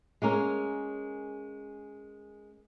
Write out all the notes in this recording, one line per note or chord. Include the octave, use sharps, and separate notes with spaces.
G#3 A#3 C#4 A#4